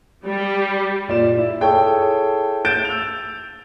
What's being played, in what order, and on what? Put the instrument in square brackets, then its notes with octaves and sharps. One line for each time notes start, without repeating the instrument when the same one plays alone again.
[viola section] G3
[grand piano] A#2 D5 E7
E4
E4 G#4 A4 C#5 G5 A5
G6 A6 D7 E7
E6 F7